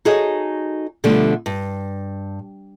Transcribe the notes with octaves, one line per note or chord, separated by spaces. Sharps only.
D#4 F#4 G#4 A4 C#5 D#5
B2 D3 F3 G3 A3 B3
G2